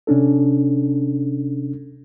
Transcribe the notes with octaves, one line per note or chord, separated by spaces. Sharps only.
C3 C#4 D4 A4